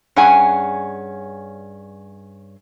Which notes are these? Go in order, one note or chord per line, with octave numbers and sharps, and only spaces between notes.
G2 C#4 G#4 F#5 G#5